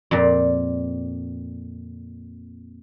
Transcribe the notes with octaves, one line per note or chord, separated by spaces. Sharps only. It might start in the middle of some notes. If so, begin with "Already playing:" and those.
F2 A#2 D5